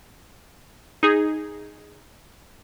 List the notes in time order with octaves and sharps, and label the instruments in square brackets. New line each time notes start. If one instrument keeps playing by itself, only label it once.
[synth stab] D#4 G#4